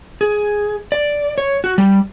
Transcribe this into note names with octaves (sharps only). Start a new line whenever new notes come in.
G#4
D5
C#5
F#4
G3